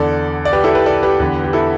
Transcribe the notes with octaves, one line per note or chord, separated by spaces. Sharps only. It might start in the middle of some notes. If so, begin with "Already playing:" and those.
Already playing: E2 D3 A4 D5
D5
G4 B4
E4 A4
G4 B4
A4 D5
G4 B4
E2 D3
G4
E4 A4